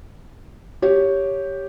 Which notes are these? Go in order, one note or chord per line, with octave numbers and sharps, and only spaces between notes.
G4 C#5